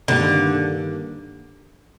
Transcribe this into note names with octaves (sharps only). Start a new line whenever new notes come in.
G2 D3 D#3 G3 A#3 D4